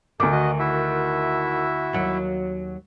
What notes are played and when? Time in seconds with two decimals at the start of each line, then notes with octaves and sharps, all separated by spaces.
0.20 D2 D#3 A4 D6
0.32 F#4 D#5
0.59 E4 F#4 E5
1.93 D#2 F#3